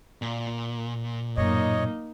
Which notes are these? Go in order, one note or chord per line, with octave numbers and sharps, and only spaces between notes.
A#2
F#2 A2 A#3 D#4 C#5 D#5